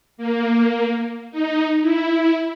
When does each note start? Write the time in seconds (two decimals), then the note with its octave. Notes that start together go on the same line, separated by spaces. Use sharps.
0.17 A#3
1.31 D#4
1.82 E4